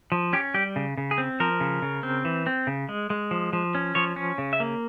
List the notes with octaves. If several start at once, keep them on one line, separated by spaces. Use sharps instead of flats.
F3
C#4 G4
G3 G4
C#3
C#3
G#4
C4
F3 A#4
C#3
C#3
C4
E3
C4
C#3
G#3
G#3
F3
F3
C#4
F3 C#5
C#4
C#3
E5
A#3